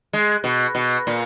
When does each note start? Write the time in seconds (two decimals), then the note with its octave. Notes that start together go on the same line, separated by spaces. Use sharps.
0.13 G#3
0.44 B2
0.75 B2
1.07 A#2